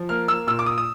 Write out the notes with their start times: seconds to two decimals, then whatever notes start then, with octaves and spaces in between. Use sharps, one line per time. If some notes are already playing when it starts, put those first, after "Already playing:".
Already playing: F3
0.09 A#3 F6
0.28 E6
0.47 A#2 E6
0.59 D6
0.66 D#6
0.78 D#6